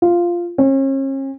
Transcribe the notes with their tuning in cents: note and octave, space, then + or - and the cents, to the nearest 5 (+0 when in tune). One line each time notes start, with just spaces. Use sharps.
F4 -5
C#4 -40